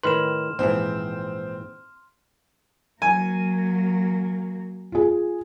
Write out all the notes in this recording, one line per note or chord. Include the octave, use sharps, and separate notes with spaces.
A2 D#3 B4 C6 F6 E7
A#1 G#2 E3 C4
F#3 A#3 G#5
F4 G#4